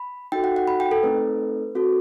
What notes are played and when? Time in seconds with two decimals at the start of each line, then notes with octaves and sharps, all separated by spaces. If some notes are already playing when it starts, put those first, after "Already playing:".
Already playing: B5
0.32 D#4 F#4 A4 G5
0.44 F#5
0.56 F#5
0.67 B5
0.80 G5
0.91 A4
1.03 A3 C4 D#4 A4 B4
1.75 C4 F#4 A4